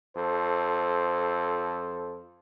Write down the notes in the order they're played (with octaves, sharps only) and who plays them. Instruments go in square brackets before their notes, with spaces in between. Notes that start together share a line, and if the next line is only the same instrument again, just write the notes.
[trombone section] F2 A4 C5